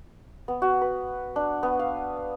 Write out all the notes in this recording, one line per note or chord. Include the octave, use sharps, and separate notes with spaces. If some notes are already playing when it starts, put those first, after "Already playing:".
B3
F#4
B4
D4
B3
F5